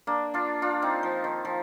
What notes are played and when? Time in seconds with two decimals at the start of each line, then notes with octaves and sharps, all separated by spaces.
0.07 A#3 D4
0.34 D4 F4
0.62 D4 F4
0.82 C4 D#4
1.03 F3
1.24 D#3
1.45 F3